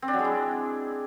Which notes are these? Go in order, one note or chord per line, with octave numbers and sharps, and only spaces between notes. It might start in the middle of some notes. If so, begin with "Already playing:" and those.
C4
D4
F#3
G#3
E4